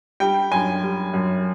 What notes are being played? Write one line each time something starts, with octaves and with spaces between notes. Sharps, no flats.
G3 G5
F#2 G#5
G3
F#2